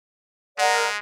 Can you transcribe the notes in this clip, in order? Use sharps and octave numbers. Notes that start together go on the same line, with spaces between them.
G#3 A#4 D5 F#5